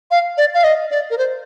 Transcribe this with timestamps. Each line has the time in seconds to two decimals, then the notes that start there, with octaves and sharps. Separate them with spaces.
0.11 F5
0.38 D5
0.54 F5
0.64 D#5
0.91 D5
1.10 A#4
1.18 C5